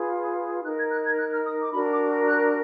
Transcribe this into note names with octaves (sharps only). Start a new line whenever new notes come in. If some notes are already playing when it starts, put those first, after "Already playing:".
Already playing: F4 G#4 B4
D#4 A#4 F#6
G#6
F#6
G#6
F#6
F6
D#6
D6
D4 F#4 A#4 B5
D6
F#6